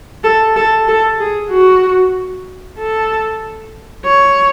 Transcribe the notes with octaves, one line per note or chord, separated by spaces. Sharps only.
A4
A4
A4
G#4
F#4
A4
C#5